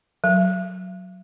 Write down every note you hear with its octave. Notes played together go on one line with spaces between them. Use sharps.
F#3